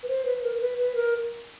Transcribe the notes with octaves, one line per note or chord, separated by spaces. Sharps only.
B4
C5
B4
A#4
A#4
B4
B4
A#4